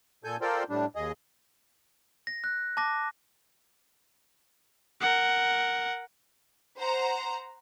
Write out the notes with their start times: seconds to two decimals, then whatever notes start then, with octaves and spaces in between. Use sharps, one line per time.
0.24 A#2 A4 G#5 G6
0.41 F4 A4 A#4 C5 D5 G5
0.70 A2 G3 D4
0.95 D#2 G#4 D#5
2.27 A#6
2.44 F#6
2.77 A5 D6 A#6
5.01 A#4 F#5
6.78 C5 F#5 A#5